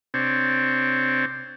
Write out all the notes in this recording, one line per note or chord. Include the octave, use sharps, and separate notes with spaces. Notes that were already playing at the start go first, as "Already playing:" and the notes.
C3 C4 D4 C#5